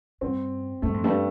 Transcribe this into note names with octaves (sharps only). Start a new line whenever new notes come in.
G2 C4
G2 A3
F2
G2 A3